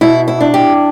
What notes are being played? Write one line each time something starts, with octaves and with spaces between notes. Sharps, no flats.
B2 E4
E4
D4
G4